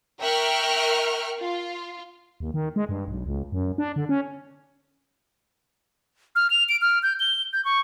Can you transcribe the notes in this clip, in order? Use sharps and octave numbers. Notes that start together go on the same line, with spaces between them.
A#4 E5 G5 C#6 F6 F#6
F4
D#2
D#3
G#3
G2
B1
C#2
F#2
D4
D3
C#4
F6
F7
D7
F6
G6
G7
G6
C#6